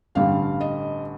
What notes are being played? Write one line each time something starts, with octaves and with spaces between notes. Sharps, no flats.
A1 G2 D3 G3 F5
D#5